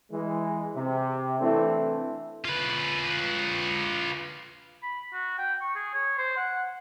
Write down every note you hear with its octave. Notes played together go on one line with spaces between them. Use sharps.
E3 G#3
C3
E3 A3 C4 D4 E4
F4 B4
B5
F#4
G5
C#6
G#4
C#5
C5
F#5